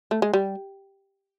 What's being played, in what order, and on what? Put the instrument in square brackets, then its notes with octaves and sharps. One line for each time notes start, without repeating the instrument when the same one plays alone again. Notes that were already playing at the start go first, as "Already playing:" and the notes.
[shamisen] A3
G#3
G3